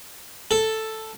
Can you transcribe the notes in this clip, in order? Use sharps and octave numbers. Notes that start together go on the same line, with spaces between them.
A4